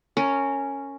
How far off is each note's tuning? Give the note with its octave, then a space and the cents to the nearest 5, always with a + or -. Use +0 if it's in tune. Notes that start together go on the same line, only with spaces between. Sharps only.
C#4 +0 A#4 -20